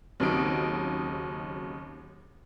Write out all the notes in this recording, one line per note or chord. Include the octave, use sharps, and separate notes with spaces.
D#2 C#3 F#3 C4 D#4 D7